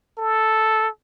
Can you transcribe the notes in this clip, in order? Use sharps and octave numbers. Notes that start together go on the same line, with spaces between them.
A4